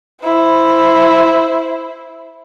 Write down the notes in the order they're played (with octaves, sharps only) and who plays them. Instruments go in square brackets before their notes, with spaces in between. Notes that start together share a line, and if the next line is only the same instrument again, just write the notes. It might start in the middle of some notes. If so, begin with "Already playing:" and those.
[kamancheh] E4 C5